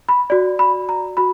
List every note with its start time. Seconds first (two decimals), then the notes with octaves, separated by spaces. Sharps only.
0.09 B5
0.30 F#4 D5
0.59 B5
0.89 A#5
1.17 F#4 B5